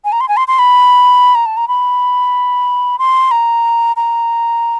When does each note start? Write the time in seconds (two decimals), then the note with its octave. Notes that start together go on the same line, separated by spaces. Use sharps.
0.05 G#5
0.12 A#5
0.21 C6
0.28 G#5
0.37 C6
0.48 C6
0.59 B5
1.35 A#5
1.46 A5
1.57 A#5
1.68 B5
2.99 C6
3.31 A#5
3.96 A#5